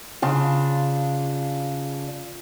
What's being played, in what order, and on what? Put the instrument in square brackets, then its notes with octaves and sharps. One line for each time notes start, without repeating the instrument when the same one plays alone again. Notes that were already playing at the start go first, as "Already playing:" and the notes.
[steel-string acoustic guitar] C#3 D4 [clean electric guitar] F4